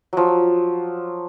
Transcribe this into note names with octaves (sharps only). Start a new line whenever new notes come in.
F3 F#3